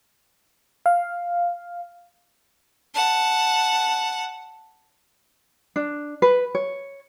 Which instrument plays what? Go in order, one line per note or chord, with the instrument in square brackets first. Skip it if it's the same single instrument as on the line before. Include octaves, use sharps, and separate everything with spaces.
[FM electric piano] F5
[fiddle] F#5 A5
[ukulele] D4
B4
C#5